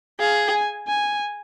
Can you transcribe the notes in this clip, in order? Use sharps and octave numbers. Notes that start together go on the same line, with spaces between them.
G#4 F5
G#5
G#5